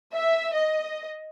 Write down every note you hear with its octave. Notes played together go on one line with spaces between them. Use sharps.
E5
D#5